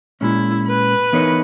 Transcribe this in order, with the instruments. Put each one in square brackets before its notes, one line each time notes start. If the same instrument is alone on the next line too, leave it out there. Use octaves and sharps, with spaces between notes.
[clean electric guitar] A#2 G#3 C#4 [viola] E4
[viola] B4
[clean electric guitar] E3 B3 D#4 A#4 C#5